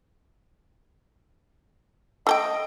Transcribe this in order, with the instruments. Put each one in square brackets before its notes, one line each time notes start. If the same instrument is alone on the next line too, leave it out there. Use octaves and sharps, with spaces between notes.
[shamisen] A3 A4 G5 [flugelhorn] D#5